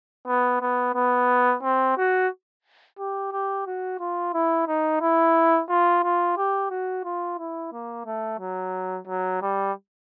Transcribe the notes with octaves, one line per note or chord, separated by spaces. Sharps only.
B3
B3
B3
C4
F#4
G4
G4
F#4
F4
E4
D#4
E4
F4
F4
G4
F#4
F4
E4
A#3
A3
F#3
F#3
G3